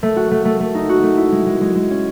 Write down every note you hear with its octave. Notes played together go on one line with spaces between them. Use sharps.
A3
F#4
A3
A3
A3
D#4
F#4
A3
E4
G#3
G#3
G#3
G#3
C#4